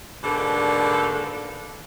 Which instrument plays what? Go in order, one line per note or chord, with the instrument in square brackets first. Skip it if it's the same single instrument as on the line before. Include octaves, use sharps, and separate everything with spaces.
[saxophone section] G#2 B2 D3 A#3 D4 A4